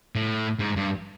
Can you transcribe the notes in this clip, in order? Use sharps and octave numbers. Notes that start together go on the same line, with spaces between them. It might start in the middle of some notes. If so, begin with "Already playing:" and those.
A2
G#2
G2